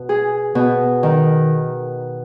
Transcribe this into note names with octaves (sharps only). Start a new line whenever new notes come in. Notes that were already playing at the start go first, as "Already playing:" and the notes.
Already playing: B2
G#4
B2
D#3